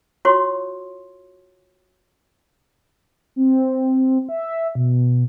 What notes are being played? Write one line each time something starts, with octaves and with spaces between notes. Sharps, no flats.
F4 F#4 C#5 C6 C#6
C4
E5
B2